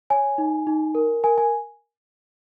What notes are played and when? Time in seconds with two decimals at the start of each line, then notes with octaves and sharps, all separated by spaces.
0.10 C#5 G#5
0.38 D#4
0.67 D#4
0.95 A#4
1.24 A#4 G#5
1.38 G#5